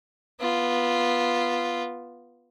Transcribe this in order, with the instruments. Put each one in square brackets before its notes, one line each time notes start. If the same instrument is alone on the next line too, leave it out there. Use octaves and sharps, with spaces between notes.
[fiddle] B3 F4